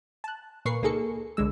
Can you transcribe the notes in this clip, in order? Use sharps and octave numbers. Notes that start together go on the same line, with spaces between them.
A5 F#6
A#2 A#4 B4 C#6 C7
C#2 A#3 D#4 G#4 A4 C#7
C2 D3 G#3 E6